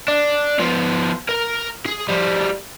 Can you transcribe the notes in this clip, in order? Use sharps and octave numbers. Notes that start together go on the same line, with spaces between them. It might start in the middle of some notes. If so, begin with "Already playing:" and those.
D4
F3 B3
A#4 A#5
G#4
F3 G3